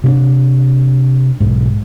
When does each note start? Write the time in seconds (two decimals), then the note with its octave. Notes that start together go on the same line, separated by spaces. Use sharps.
0.04 C3 C#4 D4
1.40 B1 G#2